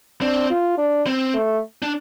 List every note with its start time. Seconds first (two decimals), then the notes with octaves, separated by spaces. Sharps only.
0.21 C4 D4
0.50 F4
0.78 D4
1.07 C4
1.34 A3
1.82 D4